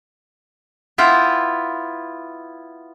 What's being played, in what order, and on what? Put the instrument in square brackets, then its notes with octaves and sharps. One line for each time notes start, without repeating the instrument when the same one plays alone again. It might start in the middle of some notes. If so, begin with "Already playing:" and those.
[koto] B3 E4 F4 G5